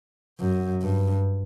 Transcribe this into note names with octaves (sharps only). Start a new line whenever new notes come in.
F#2
G2